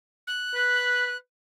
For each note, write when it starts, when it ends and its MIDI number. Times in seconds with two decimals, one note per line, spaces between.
0.27 1.17 90
0.55 1.13 71